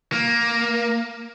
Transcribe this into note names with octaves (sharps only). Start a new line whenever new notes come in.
A#3